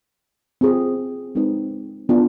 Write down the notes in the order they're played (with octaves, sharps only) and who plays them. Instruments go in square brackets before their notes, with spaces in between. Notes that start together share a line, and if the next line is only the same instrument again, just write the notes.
[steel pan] C4 F4 G#4
G#3 C4 D#4 B4
B3 D4 F4